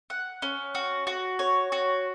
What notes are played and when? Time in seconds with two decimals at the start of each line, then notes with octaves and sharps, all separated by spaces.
0.10 F#5
0.42 C#4
0.75 F#4
1.07 F#4
1.39 C#5
1.72 F#4